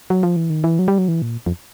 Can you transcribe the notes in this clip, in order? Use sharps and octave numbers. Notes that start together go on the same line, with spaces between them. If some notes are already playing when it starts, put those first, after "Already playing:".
F#3
F3
E3
D#3
E3
F#3
G3
F#3
E3
A#2
F2